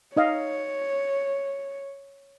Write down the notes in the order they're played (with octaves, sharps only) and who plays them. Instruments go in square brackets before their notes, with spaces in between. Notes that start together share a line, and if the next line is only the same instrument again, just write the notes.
[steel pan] D#4 D#5 F5 [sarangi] C#5